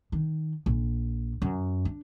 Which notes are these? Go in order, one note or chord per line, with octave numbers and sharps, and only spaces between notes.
D#3
A#1
F#2
D4